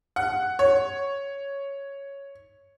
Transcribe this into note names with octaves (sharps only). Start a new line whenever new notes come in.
F#5
C#5